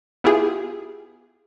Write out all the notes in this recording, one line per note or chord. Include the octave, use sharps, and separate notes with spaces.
B3 E4 F4 G4 G#4